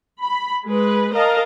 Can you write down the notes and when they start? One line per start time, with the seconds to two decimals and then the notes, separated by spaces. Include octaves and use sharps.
0.21 B5
0.67 G#3 B4
1.14 A#4 D#5 F5 A5